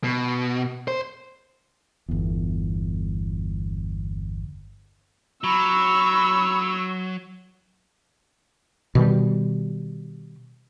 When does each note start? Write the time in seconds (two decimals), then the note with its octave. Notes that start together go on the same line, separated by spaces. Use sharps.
0.04 B2
0.88 C5
2.09 G1 E2
5.44 F#3 B5 C#6 E6
8.95 B2 D#3 G3